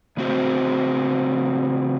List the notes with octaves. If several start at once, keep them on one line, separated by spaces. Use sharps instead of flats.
C#3 A3 C4 F#4 C5